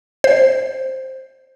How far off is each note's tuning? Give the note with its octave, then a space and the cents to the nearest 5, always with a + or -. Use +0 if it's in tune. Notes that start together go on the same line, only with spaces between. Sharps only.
C5 +5